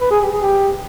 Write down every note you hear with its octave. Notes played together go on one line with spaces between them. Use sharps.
B4
G#4
G4
G#4
G4